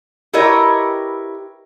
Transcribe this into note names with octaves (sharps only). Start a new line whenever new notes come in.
E4 G4 A#4 B4 C#5 D#5